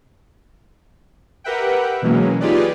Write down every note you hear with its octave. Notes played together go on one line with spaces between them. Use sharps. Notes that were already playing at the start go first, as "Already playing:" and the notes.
G4 A#4 B4 E5 F#5 G5
B2 E3 F#3 G#3 A#3 C#4
D#4 F4 G4 G#4 B4 D5